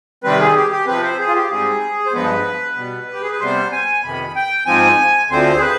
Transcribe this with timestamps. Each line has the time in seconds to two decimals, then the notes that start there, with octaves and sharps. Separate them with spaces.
0.24 C3 D#3 G3 C4 B4
0.40 G#4
0.56 G4
0.72 G4
0.87 C3 F3 C4 B4
1.03 C5
1.19 G#4
1.28 F4
1.35 G4
1.50 G#2 G3 C4 G#4
2.06 C5
2.13 G2 F3 G#3 B3 B4
2.76 B2 G3 B3
3.13 G4
3.22 G#4
3.31 B4
3.40 C3 G3 B3 C5
3.72 G#5
4.03 F2 C3 D#3 B3 B5
4.35 G5
4.66 G#2 F3 C4 G#5
5.30 D2 D3 F3 C4 C5
5.57 G#4
5.61 B4